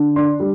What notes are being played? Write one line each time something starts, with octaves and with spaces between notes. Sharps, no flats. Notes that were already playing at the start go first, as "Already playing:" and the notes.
Already playing: D3
D4 C6
G3